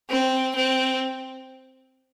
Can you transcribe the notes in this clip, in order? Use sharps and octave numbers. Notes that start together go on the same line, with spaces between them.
C4
C4